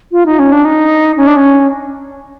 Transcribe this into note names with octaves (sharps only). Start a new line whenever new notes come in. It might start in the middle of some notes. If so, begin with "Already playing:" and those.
F4
D#4
C#4
D4
D#4
C#4
D4
C#4